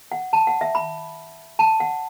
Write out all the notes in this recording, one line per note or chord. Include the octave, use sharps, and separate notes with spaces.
F#5
A5
F#5
E5
B5
A5
F#5